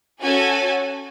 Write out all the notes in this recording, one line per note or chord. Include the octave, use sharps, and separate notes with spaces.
C#4 F#4 A4 F#5 G#5